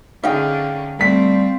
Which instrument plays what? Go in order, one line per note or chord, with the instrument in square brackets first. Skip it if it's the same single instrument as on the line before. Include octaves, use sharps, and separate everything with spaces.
[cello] D3 C#4 [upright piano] D#4 G#4 [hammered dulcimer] F5 G5
[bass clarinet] G3 [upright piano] A3 B6 [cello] C4